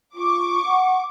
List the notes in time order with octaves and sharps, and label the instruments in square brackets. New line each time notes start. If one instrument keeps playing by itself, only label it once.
[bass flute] F4 [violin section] C#6 D6
[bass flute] F#5